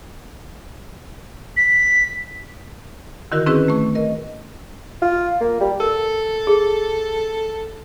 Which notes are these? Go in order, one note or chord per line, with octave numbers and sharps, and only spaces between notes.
B6
D3 D#3 E4 F#4 A#4
C4 C#4 E4 F#4 G#4 B4
A3 C#6
A#4 D#5
F4
A#3
G3
A4 A#4
G#4